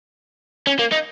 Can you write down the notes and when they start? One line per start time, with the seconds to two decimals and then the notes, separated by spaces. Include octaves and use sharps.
0.67 C#4
0.79 A#3
0.92 D#4